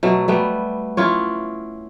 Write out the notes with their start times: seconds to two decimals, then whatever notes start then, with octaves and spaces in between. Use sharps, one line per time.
0.03 B2 F#3 A3
0.28 G3 A3 B3
0.97 C#4 E4 F4 C#5